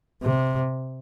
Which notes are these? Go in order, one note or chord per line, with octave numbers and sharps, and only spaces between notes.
C3